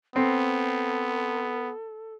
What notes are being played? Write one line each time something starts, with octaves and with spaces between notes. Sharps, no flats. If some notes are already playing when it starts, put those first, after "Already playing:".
B3 C4 A4